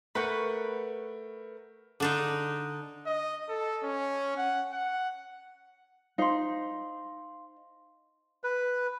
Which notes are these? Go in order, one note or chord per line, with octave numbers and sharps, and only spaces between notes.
A3 A#4 B4 F#5 C#6 G6
D3 D4 D#4
D#5
A4
C#4
F#5
F#5
D#4 C5 F5 C6
B4